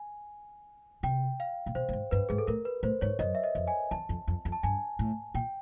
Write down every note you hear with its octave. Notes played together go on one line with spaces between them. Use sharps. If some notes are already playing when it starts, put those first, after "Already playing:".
Already playing: G#5
C3 G5
F5
A#2
B2 C5
A2
G#2
G2 B4
G#2 G#4
A4
A2 A#4
B4
A2 C5
G#2 C#5
F#2 D#5
E5
D#5
F2
G#5
E2 A5
F2
F2
F2
A5
G2 G#5
A2
A#2 G5